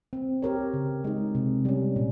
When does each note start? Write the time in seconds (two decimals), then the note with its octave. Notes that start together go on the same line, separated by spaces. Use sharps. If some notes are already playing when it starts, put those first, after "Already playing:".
0.13 C4
0.42 G4 A#4 C#5
0.74 C#3
1.04 G#3 D#4
1.35 C3
1.65 G3 C#4
1.96 A#2